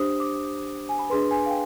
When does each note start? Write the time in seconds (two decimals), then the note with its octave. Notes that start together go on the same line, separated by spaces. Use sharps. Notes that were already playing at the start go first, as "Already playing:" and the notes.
Already playing: D4 G4 C5 D#6
0.20 D6
0.89 G#5
0.99 B5
1.10 D4 G#4 B4 C6
1.31 G#5
1.46 F5
1.50 G5